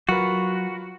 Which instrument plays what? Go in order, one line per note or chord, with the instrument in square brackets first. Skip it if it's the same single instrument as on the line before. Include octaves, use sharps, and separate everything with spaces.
[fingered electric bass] F#3 [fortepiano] F4 A#4 B4 [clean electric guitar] F#4